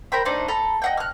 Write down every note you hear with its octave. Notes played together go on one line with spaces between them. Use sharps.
A#4 C5 G5 B5
A3 D4 D#4 C5
A4 A#5 B5
D#5 F#5 G5
F6 F#6